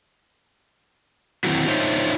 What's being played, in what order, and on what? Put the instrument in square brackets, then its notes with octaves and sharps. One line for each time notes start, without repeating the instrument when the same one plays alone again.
[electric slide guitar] D#3 F#3 C4 E4 F#4
D4 D#4 F4 C5 C#5 E5